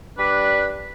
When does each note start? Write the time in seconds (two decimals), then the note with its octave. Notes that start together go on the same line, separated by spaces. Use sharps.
0.17 G3 D4 B4